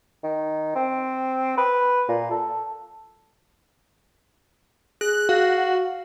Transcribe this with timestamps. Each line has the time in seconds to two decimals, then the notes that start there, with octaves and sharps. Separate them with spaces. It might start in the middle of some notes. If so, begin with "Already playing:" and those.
0.23 D#3
0.75 C4
1.58 B4
2.08 A#2
2.31 A4
5.01 G#4 F#6
5.29 F#4 F5